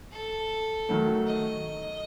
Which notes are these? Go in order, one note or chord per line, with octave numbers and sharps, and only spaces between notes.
A4
D#3 F#3 A3
D#5